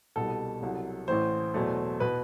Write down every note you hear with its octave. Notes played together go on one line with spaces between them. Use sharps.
C2 B2 G3 A4
C2 C3 F#3
A1 A2 E3 C5
E2 B2 F#3 A3
B2 B4